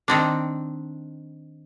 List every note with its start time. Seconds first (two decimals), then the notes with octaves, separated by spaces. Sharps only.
0.08 D#3 C4 D4